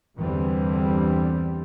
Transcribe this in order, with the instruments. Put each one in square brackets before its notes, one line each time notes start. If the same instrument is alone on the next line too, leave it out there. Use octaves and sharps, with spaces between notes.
[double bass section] E2 G2 D3 E3 G3 C4